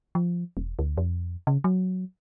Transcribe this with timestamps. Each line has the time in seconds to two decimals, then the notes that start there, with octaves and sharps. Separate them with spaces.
0.15 F3
0.57 E1
0.79 D2
0.98 F2
1.47 C#3
1.64 F#3